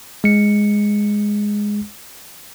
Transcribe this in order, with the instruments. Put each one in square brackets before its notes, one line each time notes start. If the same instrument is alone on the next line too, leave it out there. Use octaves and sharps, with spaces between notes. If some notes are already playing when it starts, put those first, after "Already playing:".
[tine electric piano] G#3 C#7